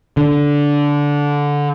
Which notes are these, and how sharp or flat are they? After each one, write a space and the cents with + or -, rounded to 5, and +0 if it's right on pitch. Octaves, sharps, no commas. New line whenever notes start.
D3 -15